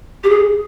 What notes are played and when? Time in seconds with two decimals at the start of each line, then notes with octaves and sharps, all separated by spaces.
0.24 G4
0.30 G#4